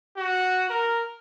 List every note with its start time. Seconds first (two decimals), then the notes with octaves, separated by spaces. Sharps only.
0.17 F#4
0.69 A#4